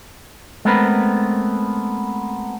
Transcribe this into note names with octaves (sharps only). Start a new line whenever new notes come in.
G#3 A3 B3 C4 A#4 B4